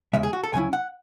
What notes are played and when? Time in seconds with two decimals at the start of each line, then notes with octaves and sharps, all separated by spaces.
0.13 E2 C#3 G#3 E5
0.23 G#4
0.33 F#4
0.43 A4
0.53 D2 C#3 F#3 C#4 E4 G#5
0.73 F#5